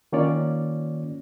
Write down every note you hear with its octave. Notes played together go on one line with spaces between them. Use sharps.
D#3 A#3 C#4 F4 C#5 D5